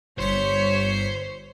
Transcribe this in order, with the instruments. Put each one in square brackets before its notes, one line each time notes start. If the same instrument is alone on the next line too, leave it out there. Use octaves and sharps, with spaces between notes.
[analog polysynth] G1 B6 C#7 [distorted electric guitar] C5 [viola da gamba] C#5